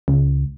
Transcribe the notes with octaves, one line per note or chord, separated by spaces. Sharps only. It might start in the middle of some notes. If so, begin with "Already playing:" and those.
C#2